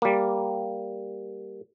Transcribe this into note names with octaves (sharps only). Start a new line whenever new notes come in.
G3 A#3